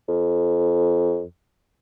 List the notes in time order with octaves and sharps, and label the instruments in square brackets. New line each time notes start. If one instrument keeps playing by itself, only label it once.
[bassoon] F2